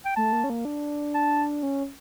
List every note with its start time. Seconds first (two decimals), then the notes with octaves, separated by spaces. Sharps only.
0.05 G5
0.16 A3 A5
0.33 A#3
0.44 C#4
0.50 A#3
0.65 D4
1.15 A5
1.63 C#4